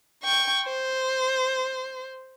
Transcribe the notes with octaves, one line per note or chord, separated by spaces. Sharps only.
G5 C#6
C5